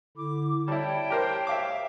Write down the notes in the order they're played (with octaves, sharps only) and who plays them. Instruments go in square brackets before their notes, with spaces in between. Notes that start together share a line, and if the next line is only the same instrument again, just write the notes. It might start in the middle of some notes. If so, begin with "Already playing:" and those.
[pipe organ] D3 E4 [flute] D6
[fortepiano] G3 E4 [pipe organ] C#5 A5 [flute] G5
[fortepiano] G4 A#4 C5
E5 F5 D6